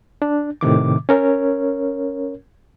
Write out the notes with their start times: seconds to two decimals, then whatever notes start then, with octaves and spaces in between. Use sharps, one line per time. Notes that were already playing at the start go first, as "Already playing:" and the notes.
0.22 D4
0.61 A2 C3 D#3 D6
1.09 C#4 A#4 C#5